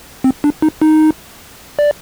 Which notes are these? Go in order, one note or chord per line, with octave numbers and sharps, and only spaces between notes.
C4
D4
D#4
D#4
D5